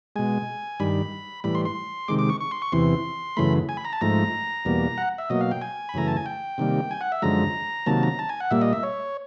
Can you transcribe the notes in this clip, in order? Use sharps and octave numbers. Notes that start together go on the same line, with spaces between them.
B2 G#3 G#5
G2 D#3 G3 B5
A2 E3 G3 B5
C6
C6
C3 D#3 G#3 D6
D6
C#6
C#6
C6
C#6
E2 C3 E3 C6
F#2 C#3 E3 A3 B5
G#5
B5
A#5
A5
G#2 F3 A3 A#5
E2 B2 G3 A#3
F#5
E5
B2 F#3 A#3 D#5
F5
G5
G#5
B5
F#2 C#3 E3 A3 A#5
A5
G#5
G5
C3 D#3 G3 A#3
G#5
F#5
E5
F#2 D3 F3 G#3 A#5
C3 D#3 F#3 A#3 A5
A#5
A5
G#5
F#5
A#2 G3 A#3 E5
D#5
E5
C#5